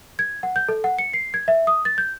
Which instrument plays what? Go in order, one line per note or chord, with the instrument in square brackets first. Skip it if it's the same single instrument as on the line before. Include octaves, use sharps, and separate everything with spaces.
[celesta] G#6
F#5
G6
A4
F#5
C#7
C7
G#6
E5
D#6
A6
G6